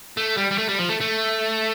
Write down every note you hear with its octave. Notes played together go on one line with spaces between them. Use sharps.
A3
G3
G3
A3
G3
F3
A3
A3